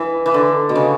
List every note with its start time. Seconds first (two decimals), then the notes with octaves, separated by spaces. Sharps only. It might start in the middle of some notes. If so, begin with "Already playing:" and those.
Already playing: E3
0.26 E3
0.34 D3
0.69 B2
0.75 C#3